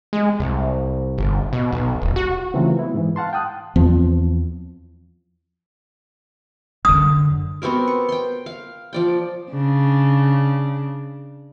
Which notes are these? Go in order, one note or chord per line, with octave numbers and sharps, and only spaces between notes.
G#3
C2
G1
B2
B1
D#1
F#4
C#3 E3 F#3 A3 C4 F4
B3 E4
G#2 E3
F5 F#5 A5 C6
G5 A5 D#6 F#6
E2 F3 C4
F#2 D3 D#6
B3 C4 F#4 A#4
C#6
G5 C6
F5
F3 D5 G5
C#3 D4